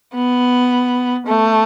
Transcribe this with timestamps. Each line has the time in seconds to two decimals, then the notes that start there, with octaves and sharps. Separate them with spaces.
0.14 B3
1.27 A3